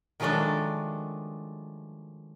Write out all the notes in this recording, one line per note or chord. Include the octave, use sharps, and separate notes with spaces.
D#3 F3 F#3 G#3 A3 D4